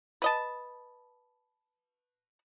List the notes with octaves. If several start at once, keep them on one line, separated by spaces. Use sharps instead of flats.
B4 D#5 A5